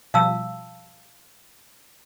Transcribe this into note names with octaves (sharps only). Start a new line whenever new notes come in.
B2 F3 G3 F5 A5 E6